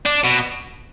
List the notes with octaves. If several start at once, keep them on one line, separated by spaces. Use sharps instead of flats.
D4
B2